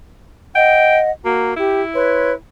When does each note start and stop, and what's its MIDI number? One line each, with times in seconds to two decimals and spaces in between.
0.55 1.11 75
0.55 1.11 78
0.55 0.97 79
1.25 1.55 58
1.25 1.53 66
1.25 1.53 82
1.56 2.33 64
1.56 1.81 67
1.95 2.32 71
1.95 2.32 73
1.95 2.32 84